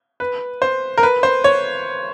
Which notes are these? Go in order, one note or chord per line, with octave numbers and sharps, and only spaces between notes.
B4
C5
A#4
B4
C5
C#5